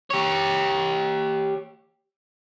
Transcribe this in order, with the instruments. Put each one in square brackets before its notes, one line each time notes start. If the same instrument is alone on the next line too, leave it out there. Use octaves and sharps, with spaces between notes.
[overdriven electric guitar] G4 C#5